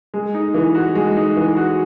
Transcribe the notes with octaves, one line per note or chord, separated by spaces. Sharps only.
G#3
D#4
E3
F#4
G#3
D#4
E3
F#4